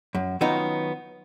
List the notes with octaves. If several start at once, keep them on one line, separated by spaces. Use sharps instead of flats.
F#2
D#3 F#3 B3 C#4 D#4 F4